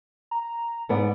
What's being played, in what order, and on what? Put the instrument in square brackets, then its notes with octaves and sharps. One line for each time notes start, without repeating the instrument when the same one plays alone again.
[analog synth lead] A#5
[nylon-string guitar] G#2 B3 D5